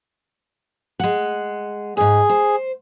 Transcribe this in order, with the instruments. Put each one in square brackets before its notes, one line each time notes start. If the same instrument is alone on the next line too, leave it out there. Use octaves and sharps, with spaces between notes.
[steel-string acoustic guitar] G#3 F#5
[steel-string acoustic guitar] D2 G#2 [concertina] G#4
[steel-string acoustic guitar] C5